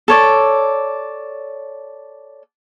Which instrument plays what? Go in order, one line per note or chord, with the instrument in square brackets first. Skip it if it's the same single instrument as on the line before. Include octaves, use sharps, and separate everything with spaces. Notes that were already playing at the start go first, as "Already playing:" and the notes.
[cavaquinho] A4 C#5 D5